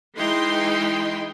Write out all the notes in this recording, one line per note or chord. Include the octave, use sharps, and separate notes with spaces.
E3 G#3 D#4 E4 G5 C6